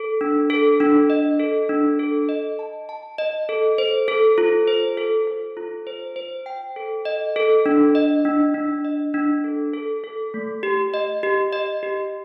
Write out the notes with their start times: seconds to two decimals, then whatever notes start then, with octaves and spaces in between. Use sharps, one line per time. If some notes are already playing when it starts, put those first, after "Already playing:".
Already playing: A4
0.21 D4
0.50 A4
0.80 D4
1.10 D#5
1.40 A4
1.69 D4
1.99 A4
2.29 D#5
2.59 A5
2.89 A5
3.18 D#5
3.49 A4
3.78 C5
4.08 A4
4.38 F4
4.67 C5
4.97 A4
5.27 A4
5.57 F4
5.87 C5
6.16 C5
6.46 G5
6.76 A4
7.05 D#5
7.36 A4
7.66 D4
7.95 D#5
8.25 D4
8.54 D4
8.85 D#5
9.14 D4
9.44 A4
9.74 A4
10.04 A4
10.34 A3
10.63 G4
10.94 D#5
11.23 G4
11.53 D#5
11.83 G4